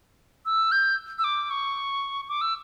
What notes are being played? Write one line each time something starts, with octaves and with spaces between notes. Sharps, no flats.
E6
G6
E6
D6
C#6
D6
E6